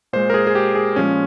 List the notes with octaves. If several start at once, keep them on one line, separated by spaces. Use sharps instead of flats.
A#2 G#3 C5
A#4
G#4
G#4
G4
G#4
A#2 F3 G#3 C#4